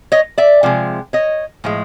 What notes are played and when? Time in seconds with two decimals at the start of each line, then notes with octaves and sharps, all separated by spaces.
0.12 C#5 D#5
0.38 D5 E5
0.63 C3 F3 G#3
1.13 C#5 D#5
1.64 A2 F3 G#3